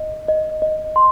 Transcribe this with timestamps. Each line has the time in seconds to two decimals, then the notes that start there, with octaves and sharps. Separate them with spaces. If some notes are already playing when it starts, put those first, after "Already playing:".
Already playing: D#5
0.28 D#5
0.62 D#5
0.96 C6